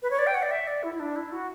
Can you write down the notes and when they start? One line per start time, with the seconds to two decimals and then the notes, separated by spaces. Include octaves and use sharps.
0.02 B4
0.11 C#5
0.19 D5
0.27 G5
0.35 F#5
0.43 D5
0.51 E5
0.67 D5
0.83 E4
0.94 E4
1.00 D4
1.16 E4
1.32 F#4